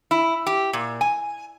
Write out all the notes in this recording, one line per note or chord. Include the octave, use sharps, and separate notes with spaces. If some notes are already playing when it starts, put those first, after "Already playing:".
E4
G4
A#2
G#5